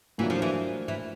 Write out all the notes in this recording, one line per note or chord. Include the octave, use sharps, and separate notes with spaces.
A2 E3 F#3 A#3 D4 F4
F3
E3
E3